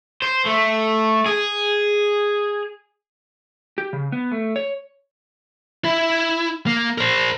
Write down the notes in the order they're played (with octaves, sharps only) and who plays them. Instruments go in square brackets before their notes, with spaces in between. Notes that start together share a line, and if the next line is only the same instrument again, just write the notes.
[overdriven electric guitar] C5
A3
G#4
[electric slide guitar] G4
C#3
B3
A3
C#5
[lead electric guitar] E4
A#3
A#4 C5